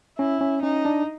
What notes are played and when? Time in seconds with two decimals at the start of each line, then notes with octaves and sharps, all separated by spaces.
0.18 C#4 E4
0.41 C#4
0.62 C#4 D#4
0.85 D4